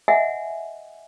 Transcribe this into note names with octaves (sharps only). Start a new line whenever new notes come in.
D#5 E5 F#5 G#5